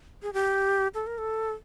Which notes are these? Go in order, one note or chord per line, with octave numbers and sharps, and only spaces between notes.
G#4
G4
A4
A#4
A4